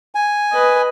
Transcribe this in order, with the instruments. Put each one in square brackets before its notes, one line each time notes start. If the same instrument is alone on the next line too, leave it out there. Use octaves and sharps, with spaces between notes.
[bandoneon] G#5
[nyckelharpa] B4 D#5